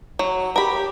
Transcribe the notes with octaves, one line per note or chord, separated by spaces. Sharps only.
F#3
G4 A#4 B5